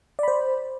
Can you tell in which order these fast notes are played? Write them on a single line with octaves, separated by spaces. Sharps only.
D5 B5 C5